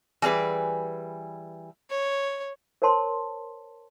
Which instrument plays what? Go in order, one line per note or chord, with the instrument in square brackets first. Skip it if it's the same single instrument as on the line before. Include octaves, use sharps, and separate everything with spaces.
[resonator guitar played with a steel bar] E3 G3 G#4 B4
[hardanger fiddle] C#5
[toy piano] A#4 C5 C#5 A5 C6